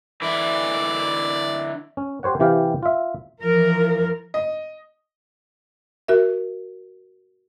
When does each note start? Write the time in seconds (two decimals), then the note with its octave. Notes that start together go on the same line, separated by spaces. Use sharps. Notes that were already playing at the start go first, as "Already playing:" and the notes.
0.22 D3 E4 B4 D5
1.97 C#4
2.23 G4 C5 C#5 F#5
2.40 C3 E3 G4 F5 G5
2.83 F4 E5
3.41 E3 F3 A#4
4.34 D#5
6.08 F#4 A#4 E5